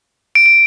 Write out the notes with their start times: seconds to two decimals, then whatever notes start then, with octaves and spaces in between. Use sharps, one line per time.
0.35 D7
0.46 D7